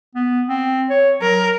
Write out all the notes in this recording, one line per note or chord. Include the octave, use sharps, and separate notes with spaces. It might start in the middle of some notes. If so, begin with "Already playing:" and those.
B3
C4
C#5
F#3 A#4